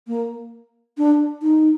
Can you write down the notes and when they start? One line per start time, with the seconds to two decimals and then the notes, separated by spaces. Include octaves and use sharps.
0.08 A#3
0.98 D4
1.42 D#4